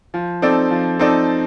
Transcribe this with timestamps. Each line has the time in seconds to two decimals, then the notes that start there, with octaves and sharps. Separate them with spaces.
0.14 F3
0.42 C4 D#4 A4 D5
0.70 F3
0.99 C4 D#4 A4 D5